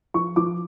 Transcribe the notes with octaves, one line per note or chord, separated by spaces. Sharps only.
F3 C#6
F3 D6